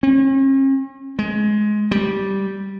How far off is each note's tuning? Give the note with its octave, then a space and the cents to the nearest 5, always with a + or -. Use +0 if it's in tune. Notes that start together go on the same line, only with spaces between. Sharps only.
C#4 -45
G#3 +15
G3 -10